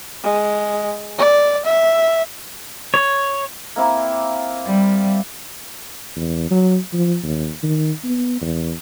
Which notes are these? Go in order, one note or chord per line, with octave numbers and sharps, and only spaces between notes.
G#3
D5
E5
C#5
A#3 C4 E4
G3
E2
F#3
F3
D#2
D#3
B3
E2